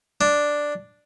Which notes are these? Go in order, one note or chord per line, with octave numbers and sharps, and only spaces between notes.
D4